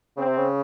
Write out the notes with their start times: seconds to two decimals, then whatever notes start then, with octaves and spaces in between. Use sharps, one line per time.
0.17 C#3 C4
0.27 C3
0.37 C#3